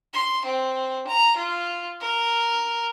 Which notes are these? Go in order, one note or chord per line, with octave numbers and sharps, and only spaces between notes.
C6
C4
A#5
F4
A#4